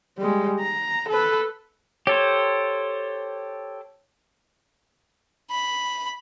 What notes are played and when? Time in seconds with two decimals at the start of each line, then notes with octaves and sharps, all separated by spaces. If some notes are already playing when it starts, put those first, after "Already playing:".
0.18 G3 G#3
0.60 A#5
1.09 A4 B4
2.07 G4 A4 C5 C#5
5.51 B5